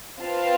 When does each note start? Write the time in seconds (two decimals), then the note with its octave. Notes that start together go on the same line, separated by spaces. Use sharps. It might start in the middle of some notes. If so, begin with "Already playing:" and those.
0.22 C4 F4 B4 F5 A5